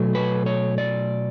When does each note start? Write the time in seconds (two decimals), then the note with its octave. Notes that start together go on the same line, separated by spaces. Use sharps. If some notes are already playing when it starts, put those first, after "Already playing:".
Already playing: B2 F#3 A3
0.15 B4
0.46 C#5
0.78 D5